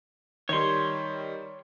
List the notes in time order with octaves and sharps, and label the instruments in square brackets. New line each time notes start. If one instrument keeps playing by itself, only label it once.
[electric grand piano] D#3 G3 [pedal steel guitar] C#5 C6